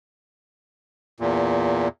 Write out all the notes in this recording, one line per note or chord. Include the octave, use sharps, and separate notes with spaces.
E2 A#2